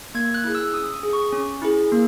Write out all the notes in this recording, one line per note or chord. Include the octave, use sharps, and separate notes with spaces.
A#3 G#6
F#6
E4 G#4
E6
C#4 D#6
D#6
G#4
C#6
C#4
E4 G#4
A#3